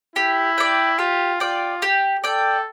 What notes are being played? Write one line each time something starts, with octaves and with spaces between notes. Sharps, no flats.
E4 G4
D5 G5
F4 G4
F4 D5 G5
G4
A4 D5 G5